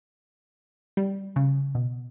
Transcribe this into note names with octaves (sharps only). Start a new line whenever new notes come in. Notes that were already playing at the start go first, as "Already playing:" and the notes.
G3
C#3
B2